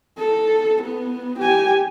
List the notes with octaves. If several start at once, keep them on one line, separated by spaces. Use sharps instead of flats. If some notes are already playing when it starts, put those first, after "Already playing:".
A4
B3
G4 G#5